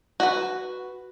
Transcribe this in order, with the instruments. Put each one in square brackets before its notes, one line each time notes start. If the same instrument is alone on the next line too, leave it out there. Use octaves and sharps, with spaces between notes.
[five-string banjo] F#4 B4